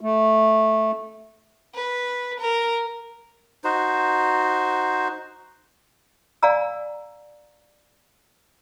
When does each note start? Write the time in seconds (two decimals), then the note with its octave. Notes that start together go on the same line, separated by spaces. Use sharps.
0.01 A3
1.74 B4
2.39 A#4
3.64 D#4 F#4 C5
6.43 D5 F5 G#5 A#5 E6